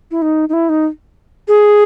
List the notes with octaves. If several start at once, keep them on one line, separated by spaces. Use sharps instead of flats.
E4
D#4
D#4
E4
D#4
G#4